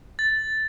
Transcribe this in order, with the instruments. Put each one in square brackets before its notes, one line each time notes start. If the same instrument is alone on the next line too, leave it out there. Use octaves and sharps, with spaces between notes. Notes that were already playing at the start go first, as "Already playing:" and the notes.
[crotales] A6